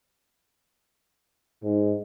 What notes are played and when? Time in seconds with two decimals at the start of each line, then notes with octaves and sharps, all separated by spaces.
1.63 G#2